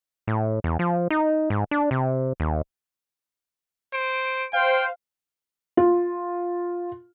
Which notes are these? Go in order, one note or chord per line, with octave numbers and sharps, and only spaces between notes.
A2
E2
F3
D#4
G#2
D4
C3
D#2
C5 D7
C5 F5 G5
F4